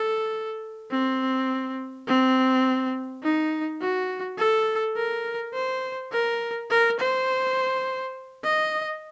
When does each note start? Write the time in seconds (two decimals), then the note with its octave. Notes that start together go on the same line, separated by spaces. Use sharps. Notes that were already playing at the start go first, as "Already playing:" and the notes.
Already playing: A4
0.92 C4
2.08 C4
3.23 D#4
3.81 F#4
4.38 A4
4.96 A#4
5.54 C5
6.12 A#4
6.70 A#4
7.00 C5
8.44 D#5